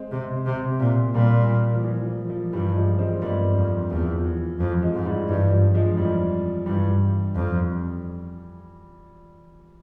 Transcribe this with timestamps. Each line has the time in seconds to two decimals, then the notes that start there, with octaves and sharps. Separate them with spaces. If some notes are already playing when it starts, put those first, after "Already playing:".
Already playing: G#3 C4
0.11 C3
0.46 C3
0.80 A#2
1.14 A#2 G3 A#3
1.74 F3
1.84 E3
2.06 F3
2.30 F3
2.53 G2 E3 G3
2.75 F3 G#3
2.99 G#3 C4
3.21 G2 G3 A#3
3.56 F2
3.90 E2 F3
4.25 E3
4.60 F2 F3
4.83 F3 G#3
4.95 G#2
5.06 E3 G3
5.29 G2 E3
5.52 F3
5.75 F3 G#3
5.97 F2 E3 G3
6.66 G2 E3 G3
7.35 F2